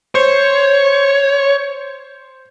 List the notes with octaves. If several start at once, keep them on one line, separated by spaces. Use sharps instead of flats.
C5 C#5